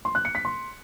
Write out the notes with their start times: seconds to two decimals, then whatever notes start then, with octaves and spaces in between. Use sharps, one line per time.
0.05 C6
0.15 F#6
0.25 C#7
0.35 B6
0.45 C6